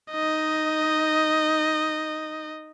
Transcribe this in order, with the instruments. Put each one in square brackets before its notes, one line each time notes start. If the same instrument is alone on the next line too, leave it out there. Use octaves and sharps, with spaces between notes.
[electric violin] D#4 D#5